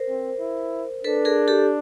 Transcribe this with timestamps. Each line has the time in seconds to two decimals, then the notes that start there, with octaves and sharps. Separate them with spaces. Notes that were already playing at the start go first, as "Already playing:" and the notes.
Already playing: A#4 C5
0.09 C4
0.40 E4
1.04 D4 A4 B4
1.25 G#4 A#4
1.48 G4 A4